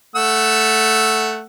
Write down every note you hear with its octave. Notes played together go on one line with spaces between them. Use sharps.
A3 F#5 E6